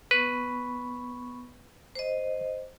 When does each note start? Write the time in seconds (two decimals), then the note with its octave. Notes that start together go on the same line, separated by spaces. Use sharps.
0.11 B3 B4 B5 C#6
1.95 C5 D#5